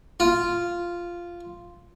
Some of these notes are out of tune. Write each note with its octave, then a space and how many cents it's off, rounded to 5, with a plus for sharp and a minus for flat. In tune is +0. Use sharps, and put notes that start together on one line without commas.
F4 -5